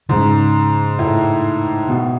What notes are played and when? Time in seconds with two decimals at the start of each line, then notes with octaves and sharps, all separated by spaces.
0.09 G#2 C#3 G#3 C#4
0.99 A2
1.88 B2